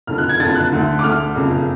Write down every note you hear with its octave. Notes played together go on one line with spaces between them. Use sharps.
F#1 F2 D3 F6
F#6
G#6
F#1 F2 D3 A6
F#6
D2 D3
D6
D2 D3 F6
F#1 F2 C#3